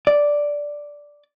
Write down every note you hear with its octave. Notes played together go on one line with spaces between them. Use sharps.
D5